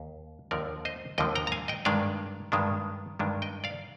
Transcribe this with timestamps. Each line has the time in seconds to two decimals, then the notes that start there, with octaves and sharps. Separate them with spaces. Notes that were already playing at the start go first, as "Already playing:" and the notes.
Already playing: D#2
0.51 D#2 D3 F3 A#4 D5
0.85 C5 D#5
1.18 D#2 D3 F3 D#5 G5
1.35 G5 A#5
1.47 A#5
1.52 F5 G#5
1.68 D#5 G5
1.85 G2 D#3 G#3 D4 D5 F5
2.52 G2 D#3 G#3 D4
3.19 G2 D#3 G#3 D4
3.42 D#5 G5
3.64 D5 F5